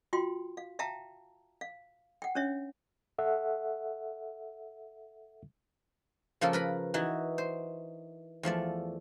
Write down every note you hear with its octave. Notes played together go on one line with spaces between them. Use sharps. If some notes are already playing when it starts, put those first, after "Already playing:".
F4 F#4 G5 C6
F5
E5 F5 G5 A5 A#5
F5
F#5 G5
C#4 D4 C#5 E5
A4 E5 F#5
C#3 F3 A#3 A4
A#4 B4 B5
E3 D#4 F#4
C5
E2 F3 A3 D5